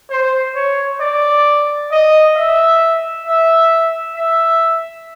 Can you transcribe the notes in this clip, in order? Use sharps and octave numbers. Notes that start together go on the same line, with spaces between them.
C5
C#5
D5
D#5
E5
E5
E5